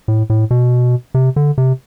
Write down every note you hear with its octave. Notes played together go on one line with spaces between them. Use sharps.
A2
A2
B2
C3
D3
C3